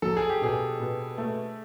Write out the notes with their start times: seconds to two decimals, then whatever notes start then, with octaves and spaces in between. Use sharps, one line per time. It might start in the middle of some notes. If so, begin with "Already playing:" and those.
0.02 F#3 A4
0.17 G#4
0.30 G4
0.42 B2 G#4
0.80 B2
1.18 A3